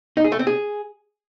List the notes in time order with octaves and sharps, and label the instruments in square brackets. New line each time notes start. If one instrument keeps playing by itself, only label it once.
[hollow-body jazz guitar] D#4
G#4
A3
C4
G#4